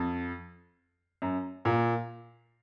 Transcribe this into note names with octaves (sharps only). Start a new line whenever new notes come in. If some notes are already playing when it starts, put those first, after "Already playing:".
Already playing: F2
F#2
A#2